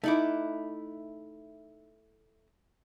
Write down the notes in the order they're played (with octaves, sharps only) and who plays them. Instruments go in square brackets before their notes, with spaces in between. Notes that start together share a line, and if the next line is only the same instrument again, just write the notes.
[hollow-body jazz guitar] A3 E4 [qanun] D#4 F#5 D6